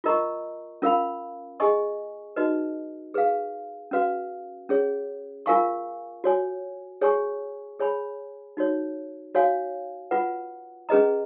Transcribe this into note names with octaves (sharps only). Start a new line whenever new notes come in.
F4 A#4 D#5 A#5 C#6
C#4 F4 A#4 F5 B5
G#4 D#5 G#5 C#6
D#4 F#4 B4 D#5
G#4 B4 F5
C#4 F#4 B4 F5
C#4 G#4 C#5
F4 A#4 F5 G#5 C#6
F#4 C#5 G#5
G#4 C#5 G#5 C#6
G#4 C#5 G#5 B5
D#4 F#4 C#5
F#4 C#5 F5 G#5
F4 B4 F#5
C#4 G#4 B4 D#5 A#5